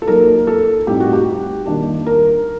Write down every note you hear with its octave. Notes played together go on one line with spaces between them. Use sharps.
A4
F#3 A#3 D#4 A#4
A4
A2 G3 C4 D#4 G4
F#4
G4
D#3 G3 A#3 D4
A#4